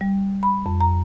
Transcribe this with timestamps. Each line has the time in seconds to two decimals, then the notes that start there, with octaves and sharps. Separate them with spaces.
0.01 G3
0.43 B5
0.66 F2
0.81 A#5